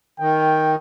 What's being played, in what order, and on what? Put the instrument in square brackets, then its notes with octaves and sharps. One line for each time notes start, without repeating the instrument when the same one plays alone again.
[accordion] D#3 [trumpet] G5